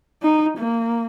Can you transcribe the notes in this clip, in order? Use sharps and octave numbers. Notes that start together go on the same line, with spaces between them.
D#4
A#3